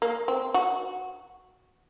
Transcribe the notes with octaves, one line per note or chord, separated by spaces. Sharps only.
A#3
C4
F#4